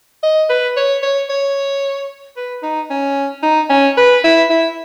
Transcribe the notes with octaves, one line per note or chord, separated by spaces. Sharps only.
D#5
B4
C#5
C#5
C#5
B4
D#4
C#4
D#4
C#4
B4
E4
E4